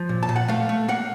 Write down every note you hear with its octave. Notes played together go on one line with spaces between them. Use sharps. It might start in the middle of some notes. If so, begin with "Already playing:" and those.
Already playing: F3
A#2
A5
A#2
F#5
A3 F5
A3
A#3 F#5